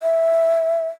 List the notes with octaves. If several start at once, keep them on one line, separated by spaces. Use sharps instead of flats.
E5